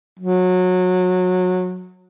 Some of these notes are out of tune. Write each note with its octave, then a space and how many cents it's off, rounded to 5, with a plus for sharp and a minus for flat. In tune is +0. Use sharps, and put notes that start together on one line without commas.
F#3 -20